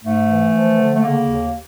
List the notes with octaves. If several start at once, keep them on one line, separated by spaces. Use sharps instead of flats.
G#2 A3
E3
F3
D3
A3
C#3 A#3
D#2